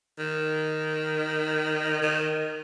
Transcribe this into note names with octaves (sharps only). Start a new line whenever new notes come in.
D#3
D#3